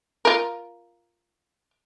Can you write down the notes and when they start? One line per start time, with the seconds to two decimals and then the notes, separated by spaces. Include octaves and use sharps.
0.25 F4 A#4